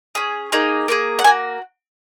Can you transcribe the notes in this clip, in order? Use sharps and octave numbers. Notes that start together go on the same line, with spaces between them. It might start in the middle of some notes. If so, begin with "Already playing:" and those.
C#4 G#4
A#3 D#4 G#4
A#3 D#4 G#4
F#5
A#3 F#4 G#5